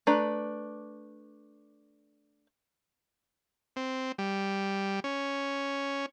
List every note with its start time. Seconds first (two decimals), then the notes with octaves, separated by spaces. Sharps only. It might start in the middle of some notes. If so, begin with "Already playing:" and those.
0.07 A3 D4 B4 A#5
3.76 C4
4.18 G3
5.04 C#4